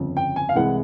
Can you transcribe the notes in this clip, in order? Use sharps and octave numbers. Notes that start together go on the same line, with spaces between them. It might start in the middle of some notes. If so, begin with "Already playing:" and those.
Already playing: G1 F2 C#3
G5
G#5
F5
C2 C3 E3 G#3 F#5